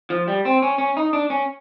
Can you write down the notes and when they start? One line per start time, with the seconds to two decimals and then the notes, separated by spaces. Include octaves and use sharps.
0.10 F3
0.28 G3
0.45 C4
0.62 C#4
0.78 C#4
0.97 D#4
1.13 D4
1.30 C#4